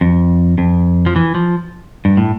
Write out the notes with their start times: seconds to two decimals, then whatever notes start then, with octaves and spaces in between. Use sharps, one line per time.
0.01 F2
0.58 F2
1.06 F3
1.16 E3
1.35 F3
2.05 G2
2.17 A2